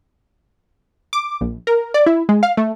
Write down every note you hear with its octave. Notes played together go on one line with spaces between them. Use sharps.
D6
A#1
A#4
D5
E4
G#3
F5
A3